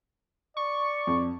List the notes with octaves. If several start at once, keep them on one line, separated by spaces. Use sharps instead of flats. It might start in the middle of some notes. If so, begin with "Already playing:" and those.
D5 C#6
F2